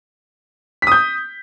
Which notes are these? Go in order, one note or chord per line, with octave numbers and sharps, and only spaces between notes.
D#6 G6 B6